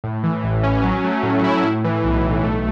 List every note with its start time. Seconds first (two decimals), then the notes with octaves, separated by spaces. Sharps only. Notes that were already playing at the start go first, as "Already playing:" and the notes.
0.04 A2
0.23 E3
0.43 A1
0.63 C#4
0.83 F#3
1.04 A3
1.23 A2
1.44 E4
1.63 A2
1.84 E3
2.04 B1
2.24 B1
2.43 A3